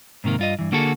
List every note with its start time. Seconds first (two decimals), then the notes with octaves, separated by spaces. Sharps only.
0.24 G#2 C3 D#3 A#3
0.39 G2 F4 D#5
0.59 G2 E3
0.72 D3 A#3 F#4 G#4 A4